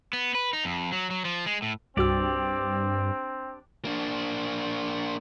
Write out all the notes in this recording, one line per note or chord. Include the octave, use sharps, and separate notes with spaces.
B3
B4
D#4
F2
F#3
F#3
F3
G#3
A2
C2 G2 C4 D4 F#4 G4 D5 E6
A#3 D4